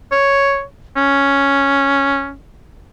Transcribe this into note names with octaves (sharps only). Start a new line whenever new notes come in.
C#5
C#4